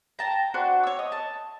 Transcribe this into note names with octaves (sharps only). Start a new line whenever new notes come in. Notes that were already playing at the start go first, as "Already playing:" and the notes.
G5 A5 A#5
D4 F#4 C5 D5
C#5 E6
D#5
A5